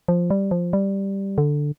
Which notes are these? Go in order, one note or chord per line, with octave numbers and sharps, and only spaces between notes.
F3
G3
F3
G3
D3